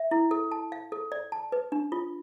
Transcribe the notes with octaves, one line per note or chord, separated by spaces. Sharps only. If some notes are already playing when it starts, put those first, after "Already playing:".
Already playing: E5
E4
A4
A5
F5
A4
D5
A5
B4
D4
F4